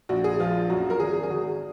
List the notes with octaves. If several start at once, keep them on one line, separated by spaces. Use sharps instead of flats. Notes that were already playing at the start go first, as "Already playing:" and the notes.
A#1 F#4
G#4
F3 F4
F#2 F#4
A#4
G#1 G#4
G#4
G#1 F#4